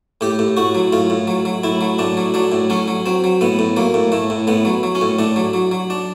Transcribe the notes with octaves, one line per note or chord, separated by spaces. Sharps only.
A2 G4
A2
A2 F#4
F#3
A2 F4
A2
F#3
F#3
A2 E4
F#3
A2 D4
F#3
F#3 D4
A2
F#3 C#4
F#3
F#3 C4
F#3
A2 B3
A2
F#3 A#3
A2
A2 A3
A2
A2 B3
F#3
F#3
C#4
A2
A2 D4
F#3
F#3
F#3
D4